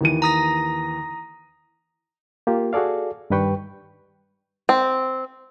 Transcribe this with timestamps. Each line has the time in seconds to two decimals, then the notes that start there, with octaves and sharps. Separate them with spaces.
0.01 D#2 E3 D#7
0.22 A#5 D#6 A#6
2.47 A#3 F4 G4
2.73 F#4 G#4 A4 D5 F5
3.30 G2 D#3 G3 B4 G5 C#6
4.69 C4